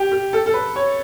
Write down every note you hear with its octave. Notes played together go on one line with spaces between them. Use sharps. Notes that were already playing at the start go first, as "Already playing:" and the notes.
Already playing: G4
G4
A4
A4
B4
C#5